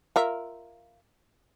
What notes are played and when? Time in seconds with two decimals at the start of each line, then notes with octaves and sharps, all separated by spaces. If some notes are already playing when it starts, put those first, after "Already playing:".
0.16 F4 A#4 E5